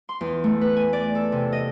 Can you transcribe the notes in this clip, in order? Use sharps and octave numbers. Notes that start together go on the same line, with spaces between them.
C6
E2
A3
B4
G#5
D5
A4
C3
D#5